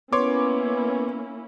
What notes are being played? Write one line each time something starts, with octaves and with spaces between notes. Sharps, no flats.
A#3 B3 C#4 E4 C#5 C6 D6